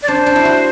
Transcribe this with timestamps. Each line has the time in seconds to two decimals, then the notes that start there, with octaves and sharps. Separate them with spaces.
0.02 D5
0.08 D4 C5
0.26 D4
0.36 E4
0.45 F#4